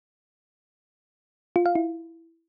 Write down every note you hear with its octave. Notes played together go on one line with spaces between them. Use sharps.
F4
F5
E4